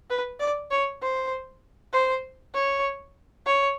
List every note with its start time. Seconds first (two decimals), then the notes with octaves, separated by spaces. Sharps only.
0.10 B4
0.40 D5
0.71 C#5
1.02 C5
1.93 C5
2.54 C#5
3.46 C#5